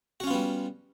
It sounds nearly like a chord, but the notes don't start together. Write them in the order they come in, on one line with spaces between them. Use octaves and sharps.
F#4 C#4 F4 B3 G3